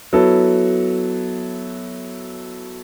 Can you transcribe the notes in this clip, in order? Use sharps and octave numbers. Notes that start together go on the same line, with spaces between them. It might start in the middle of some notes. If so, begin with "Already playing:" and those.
F#3 B3 E4 A4